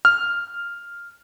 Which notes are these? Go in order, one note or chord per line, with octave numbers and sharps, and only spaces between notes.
F6